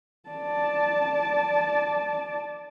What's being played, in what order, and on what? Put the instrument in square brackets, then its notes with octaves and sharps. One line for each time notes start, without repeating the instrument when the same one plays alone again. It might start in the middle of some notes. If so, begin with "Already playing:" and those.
[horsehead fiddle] D5 A5